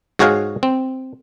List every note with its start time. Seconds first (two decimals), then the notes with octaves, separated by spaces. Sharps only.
0.19 G#2 F#4 G#4 C#5 F5
0.63 C4